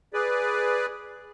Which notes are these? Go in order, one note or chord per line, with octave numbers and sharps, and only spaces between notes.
G#4 B4 D5